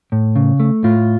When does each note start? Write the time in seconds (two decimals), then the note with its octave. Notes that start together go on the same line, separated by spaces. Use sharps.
0.12 A2
0.36 C#3
0.60 A3
0.84 A2 F4